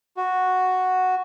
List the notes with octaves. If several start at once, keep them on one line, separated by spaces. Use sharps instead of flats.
F#4